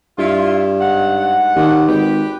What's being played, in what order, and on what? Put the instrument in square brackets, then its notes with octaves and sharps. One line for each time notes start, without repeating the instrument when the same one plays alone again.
[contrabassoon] G2 [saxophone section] E4 F4
[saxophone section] G#2 F#5
[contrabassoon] D#2
[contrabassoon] G#1 [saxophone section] G4 B4